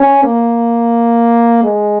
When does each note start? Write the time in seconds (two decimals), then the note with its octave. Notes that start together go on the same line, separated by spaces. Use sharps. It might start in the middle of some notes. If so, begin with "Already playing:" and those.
Already playing: C#4
0.23 A#3
1.64 G#3